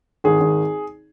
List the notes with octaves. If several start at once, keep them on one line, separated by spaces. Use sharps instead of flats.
G#1 G#4
G#1